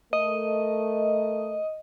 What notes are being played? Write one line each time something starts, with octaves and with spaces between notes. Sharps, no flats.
A3 A#4 D#5